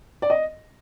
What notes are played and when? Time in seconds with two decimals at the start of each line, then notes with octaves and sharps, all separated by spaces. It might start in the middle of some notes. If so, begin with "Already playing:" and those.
0.22 D5
0.30 D#5